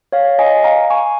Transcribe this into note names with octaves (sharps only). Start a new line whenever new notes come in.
C#5 F5
D#5 G#5
F5 A#5
G#5 C#6